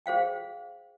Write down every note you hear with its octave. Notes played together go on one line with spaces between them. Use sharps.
G#4 C5 F5 G5